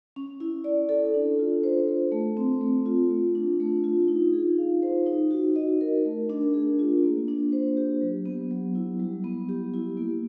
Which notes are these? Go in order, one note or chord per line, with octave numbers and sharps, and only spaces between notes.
C#4
E4
D5
A4
D4
F4
C5
A4
A3
C4
A3
F4
A3
D4
A3
F4
D#4
G#4
F5
C5
D#4
F#4
D#5
A#4
A3
D4
G#4
F4
A#3
D4
C5
G4
F#3
B3
F#3
E4
G3
B3
G4
E4
A#3